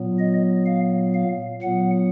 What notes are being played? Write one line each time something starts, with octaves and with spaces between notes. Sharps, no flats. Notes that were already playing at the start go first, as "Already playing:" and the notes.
Already playing: A#2 F#3 B3
D#5
F5
F5
A#2 F#3 B3 F#5